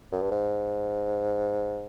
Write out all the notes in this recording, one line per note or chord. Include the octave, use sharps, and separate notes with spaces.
F#2
G2
G#2